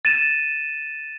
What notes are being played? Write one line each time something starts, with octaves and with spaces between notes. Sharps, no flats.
A6 D#7 E7